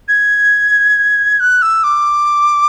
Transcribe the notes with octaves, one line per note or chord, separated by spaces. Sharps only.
G#6
F#6
E6
D6